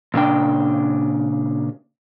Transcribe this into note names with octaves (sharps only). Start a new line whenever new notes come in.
A#2 C#3 D4 G5